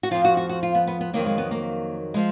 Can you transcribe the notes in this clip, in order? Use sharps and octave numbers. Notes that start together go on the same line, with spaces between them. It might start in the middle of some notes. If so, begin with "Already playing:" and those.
F#4
F2 F3 F4
F#4
F#4
F#4
F4
B3
B3
B3
F2 D#3 F#3 A#3
G#3
B3
A#3
F3 G#3